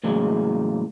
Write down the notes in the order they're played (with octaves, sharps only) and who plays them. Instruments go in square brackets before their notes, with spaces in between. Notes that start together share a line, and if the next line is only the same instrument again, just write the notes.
[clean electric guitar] A2 C#3 E3 F#3 G#3 A#3